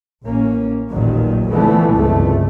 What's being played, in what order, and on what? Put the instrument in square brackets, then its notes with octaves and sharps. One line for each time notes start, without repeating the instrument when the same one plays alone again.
[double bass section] A1 A#3 C#4
A1 D#2 A#2 D#3 F#3
D3 E3 F3 A3 B3 C4
F#1 C#2 G2 C3 A3